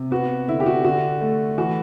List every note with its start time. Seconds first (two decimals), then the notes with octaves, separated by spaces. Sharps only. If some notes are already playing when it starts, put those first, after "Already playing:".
Already playing: C3
0.11 B3 F#4
0.48 D3 E4
0.60 G4
0.66 F#4
0.84 D3 F#4
1.21 A3
1.58 E3 F#4